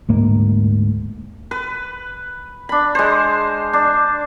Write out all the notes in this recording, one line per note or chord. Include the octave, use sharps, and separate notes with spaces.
D2 G#2 A#3
B4
D4 B5
G#3 C5
D4